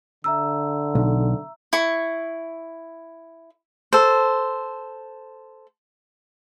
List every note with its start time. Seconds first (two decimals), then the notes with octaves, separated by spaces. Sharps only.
0.24 D3 E5 A#5 E6
0.95 B1
1.73 E4 C#6
3.93 A4 C5